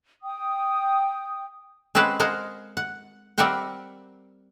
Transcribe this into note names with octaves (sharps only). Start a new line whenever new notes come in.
G5 D#6
G#3 C4 C#4 B4 C5 F#5
G#3 A#4 C5 F5 F#5
F#5
G3 C4 A#4 E5 F#5 G5